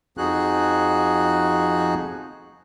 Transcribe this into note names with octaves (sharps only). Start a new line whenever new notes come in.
F2 F3 D#4 F#4 G#4 F#6